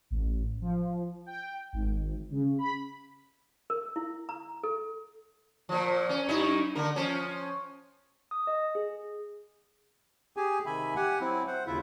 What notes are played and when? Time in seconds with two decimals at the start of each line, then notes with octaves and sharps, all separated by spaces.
0.10 A1
0.61 F3
1.26 G5
1.73 G#1
2.31 C#3
2.58 B5
3.70 A#4
3.96 E4
4.29 A#5
4.63 A4
5.69 A#2 F3
6.09 C#4
6.28 F#2 D#4 E4
6.75 D3 A#3 A#4
6.96 F3 C#4
8.31 D#6
8.47 D#5
8.75 G#4
10.37 G4 G#4 G#5
10.66 C3 D#3 E5 G#5 B5
10.96 G4 F#5 G#5
11.20 F#3 C4 E4
11.47 C5 F#5
11.67 D#2 C#3 E4 F4 E5